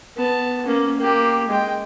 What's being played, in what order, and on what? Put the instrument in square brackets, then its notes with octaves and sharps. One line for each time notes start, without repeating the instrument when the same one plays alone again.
[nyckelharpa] B3 A5
A#3 C#4
A#3 G4
G#3 G5